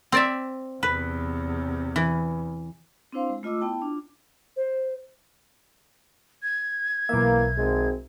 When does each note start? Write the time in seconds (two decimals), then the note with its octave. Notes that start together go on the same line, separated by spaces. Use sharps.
0.12 C4 D5 E5
0.83 E2 C3 B4
1.96 E3
3.12 C4 D4 E4 C5 F5 C6
3.29 G#3
3.43 A3 F4 D#5 D6 E6
3.61 B3 E4 G5 A5
3.82 D4 F4
4.57 C5
6.43 G#6
7.09 B1 E3 A#3 E5
7.56 G#1 G#3 C4